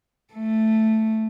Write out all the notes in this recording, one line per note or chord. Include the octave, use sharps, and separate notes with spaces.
A3